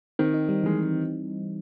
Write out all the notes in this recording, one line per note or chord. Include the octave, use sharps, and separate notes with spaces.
D#3 C4
D#4
G3
E3 G#3